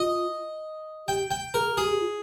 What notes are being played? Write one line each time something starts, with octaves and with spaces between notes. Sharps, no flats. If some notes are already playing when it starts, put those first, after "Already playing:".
Already playing: F4 D#5
G4 G5
G5
G#4 A#4
G#4
G4 G#4
G4
F4